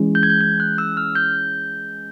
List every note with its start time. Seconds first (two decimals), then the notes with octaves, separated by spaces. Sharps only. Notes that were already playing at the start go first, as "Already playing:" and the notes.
Already playing: E3 G#3 C#4
0.15 G6
0.23 G#6
0.30 G6
0.41 G6
0.60 F#6
0.78 E6
0.97 F6
1.15 G6